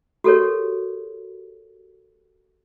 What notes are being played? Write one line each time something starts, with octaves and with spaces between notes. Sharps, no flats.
F#4 G4 A4 A#4 C#5